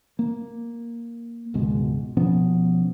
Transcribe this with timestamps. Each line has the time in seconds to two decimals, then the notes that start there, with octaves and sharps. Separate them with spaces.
0.19 A#3
1.54 G#1 C#2 B2 G#3
2.17 B2 F3 B3 C#4